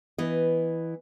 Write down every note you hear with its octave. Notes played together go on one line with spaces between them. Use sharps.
E3 B3 D#5